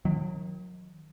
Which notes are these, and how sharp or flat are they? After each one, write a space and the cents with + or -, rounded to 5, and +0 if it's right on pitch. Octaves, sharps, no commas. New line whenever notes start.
D#3 +10 F#3 -35